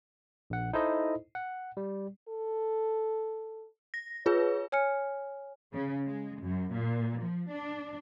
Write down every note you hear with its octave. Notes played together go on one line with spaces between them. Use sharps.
A#1 F#5
D#4 E4 A4 C5 D#5
F#5
G3
A4
A#6
F4 G#4 B4 C#5
C#5 G#5 F6 C#7
C#3
G#3
F#2
A#2
F3
D4